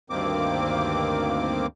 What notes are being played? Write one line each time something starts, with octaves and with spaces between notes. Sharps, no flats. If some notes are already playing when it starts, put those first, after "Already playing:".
D2 G2 D#3 A#3 C4 D6